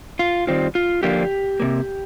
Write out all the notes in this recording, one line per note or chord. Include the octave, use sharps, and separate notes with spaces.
F4
D#3 G3 C4 F4
F4
D3 F3 A#3 D4 F4 G4
C3 D#3 A#3